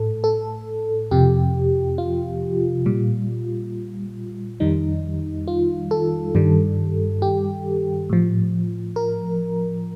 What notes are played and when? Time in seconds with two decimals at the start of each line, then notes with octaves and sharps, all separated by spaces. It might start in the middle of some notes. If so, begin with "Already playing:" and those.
Already playing: A2 A4
0.24 A4
1.11 F2 C3 F3 G4
1.98 F4
2.86 A#2 G3
4.60 F2 D#3 G3 D#4
5.48 F4
5.91 A4
6.35 G2 D#3 G3
7.22 G4
8.10 A2 F3
8.96 A#4